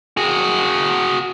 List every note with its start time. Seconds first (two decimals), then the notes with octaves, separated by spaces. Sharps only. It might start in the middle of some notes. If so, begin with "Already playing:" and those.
0.17 F#4 G#4